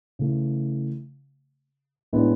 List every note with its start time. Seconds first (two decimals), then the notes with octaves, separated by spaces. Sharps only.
0.19 C#3 E3 A3
2.13 A2 E3 G#3 B3 D4